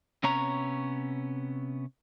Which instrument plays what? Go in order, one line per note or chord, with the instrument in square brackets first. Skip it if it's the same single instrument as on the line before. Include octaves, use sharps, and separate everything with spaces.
[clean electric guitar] C3 B3 C#4 C#5 A#5